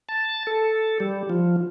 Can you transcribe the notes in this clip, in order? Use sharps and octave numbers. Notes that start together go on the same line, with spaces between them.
A5
A4
G3
F3